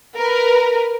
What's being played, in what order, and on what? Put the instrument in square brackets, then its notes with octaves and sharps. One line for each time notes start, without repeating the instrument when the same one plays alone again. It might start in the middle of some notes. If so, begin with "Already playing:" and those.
[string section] A#4 B4